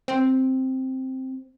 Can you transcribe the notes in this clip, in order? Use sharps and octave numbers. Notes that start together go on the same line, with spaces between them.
C4